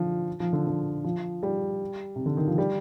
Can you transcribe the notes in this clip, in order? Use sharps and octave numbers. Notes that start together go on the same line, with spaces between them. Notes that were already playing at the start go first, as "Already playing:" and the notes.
Already playing: D3 F3
F3
D3
D3
F3
G3
C3
D3
D#3
F3
G3